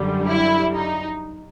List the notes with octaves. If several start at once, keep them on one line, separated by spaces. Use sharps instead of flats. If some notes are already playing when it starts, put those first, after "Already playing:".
Already playing: F#2 D3 G3
E4
D#4